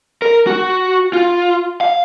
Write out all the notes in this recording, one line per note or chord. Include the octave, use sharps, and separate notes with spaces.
A#4
F#4
F4
F5